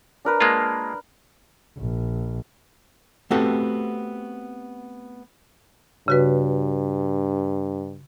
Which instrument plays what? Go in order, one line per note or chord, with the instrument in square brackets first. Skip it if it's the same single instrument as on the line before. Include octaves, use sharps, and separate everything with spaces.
[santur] D4 A#4 B4
[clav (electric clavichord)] G#3 A#3 F4
[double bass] A#1
[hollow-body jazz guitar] A3 B3 C4 F#4 G4 A4
[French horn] G2 [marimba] C#3 F#4 B4